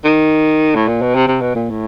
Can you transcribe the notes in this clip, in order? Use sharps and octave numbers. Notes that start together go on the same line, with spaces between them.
D#3
A2
A#2
B2
C3
C3
B2
A#2
A2